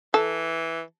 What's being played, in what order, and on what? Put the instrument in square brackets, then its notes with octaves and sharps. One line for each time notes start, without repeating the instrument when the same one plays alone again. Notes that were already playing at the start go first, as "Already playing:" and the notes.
[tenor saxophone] E3 [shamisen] A4